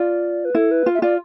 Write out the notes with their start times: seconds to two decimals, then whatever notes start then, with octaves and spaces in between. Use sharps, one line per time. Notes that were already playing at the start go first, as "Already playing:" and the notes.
Already playing: F4 D5
0.45 B4
0.55 E4 A4
0.71 B4
0.86 F4
0.95 E5
1.02 F4 D5